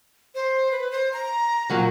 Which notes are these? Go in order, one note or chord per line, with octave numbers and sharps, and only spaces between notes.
C5
B4
C5
A#5
A#2 F#3 A#3